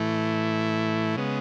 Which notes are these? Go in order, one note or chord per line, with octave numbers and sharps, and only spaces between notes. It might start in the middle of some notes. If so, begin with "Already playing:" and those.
Already playing: A2 E3 A3 E4
C#3 G#3 B3